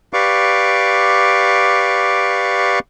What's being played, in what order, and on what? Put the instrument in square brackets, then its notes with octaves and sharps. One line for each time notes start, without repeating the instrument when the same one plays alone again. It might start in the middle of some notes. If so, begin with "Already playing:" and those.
[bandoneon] G4 B4 D5 F5 C#6 D6